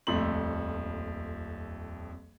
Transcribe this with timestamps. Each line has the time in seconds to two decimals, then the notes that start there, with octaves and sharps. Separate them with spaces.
0.07 D#1 A#1 F2 A3 C6 F#7